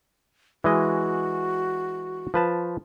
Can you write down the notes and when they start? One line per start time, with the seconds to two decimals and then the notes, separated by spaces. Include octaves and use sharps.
0.64 E3 G#3 F#4 D#5
2.34 F3 B4 A5